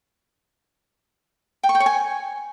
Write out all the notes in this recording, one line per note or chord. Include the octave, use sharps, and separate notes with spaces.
G5
C#6
G5
C#5
G#5